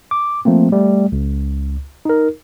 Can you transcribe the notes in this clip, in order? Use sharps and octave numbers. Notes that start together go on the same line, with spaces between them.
D6
F3 A3 A#3 C4
G3 A3
C#2
D#4 A#4